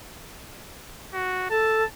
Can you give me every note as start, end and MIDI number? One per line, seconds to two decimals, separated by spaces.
1.13 1.46 66
1.50 1.83 69
1.50 1.86 81